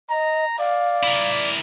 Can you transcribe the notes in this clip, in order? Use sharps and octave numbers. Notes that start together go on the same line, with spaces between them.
D#5 A#5
D5 F5
E4 A#4